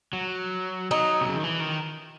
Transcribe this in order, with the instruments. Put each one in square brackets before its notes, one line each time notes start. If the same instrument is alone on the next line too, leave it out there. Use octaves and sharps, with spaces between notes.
[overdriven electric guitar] F#3
[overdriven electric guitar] F#3 [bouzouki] D#4
[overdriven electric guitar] C3
C#3
D#3
E3
D#3